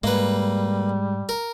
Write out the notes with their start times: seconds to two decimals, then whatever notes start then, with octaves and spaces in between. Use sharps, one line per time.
0.04 G#2 G3 G#3 A#3 B4
1.29 A#4